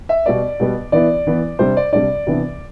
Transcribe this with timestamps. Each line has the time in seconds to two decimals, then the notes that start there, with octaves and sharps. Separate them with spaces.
0.09 E5
0.26 B2 G3 B3 D5
0.60 B2 G3 B3
0.92 E3 B3 E4 D5
1.27 E3 B3 E4
1.59 C3 G3 D4 C5
1.77 D5
1.93 C3 G3 D4 D5
2.27 C3 E3 B3 D4